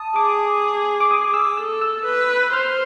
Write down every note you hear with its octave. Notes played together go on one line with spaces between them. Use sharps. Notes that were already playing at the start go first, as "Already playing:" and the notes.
Already playing: A5 D#6
G#4 D6
D6
D#6
E6
A4 E6
E6
B4
C5 F6